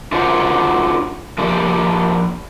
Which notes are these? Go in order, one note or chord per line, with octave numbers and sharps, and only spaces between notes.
D4 F4 F#4 C5 C#5
F3 A#3 D4 G4 D5